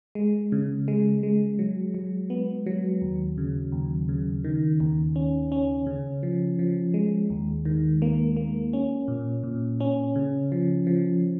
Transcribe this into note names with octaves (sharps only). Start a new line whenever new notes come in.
G#3
C#3
G#3
G#3
F#3
F#3
B3
F#3
D#2
C#3
D#2
C#3
D#3
D#2
C#4
C#4
C#3
F3
F3
G#3
D#2
D#3
A#3
A#3
C#4
A#2
A#2
C#4
C#3
F3
F3